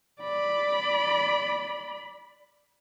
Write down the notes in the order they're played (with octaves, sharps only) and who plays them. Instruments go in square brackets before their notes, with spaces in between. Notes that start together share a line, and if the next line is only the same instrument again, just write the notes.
[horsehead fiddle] D5 B5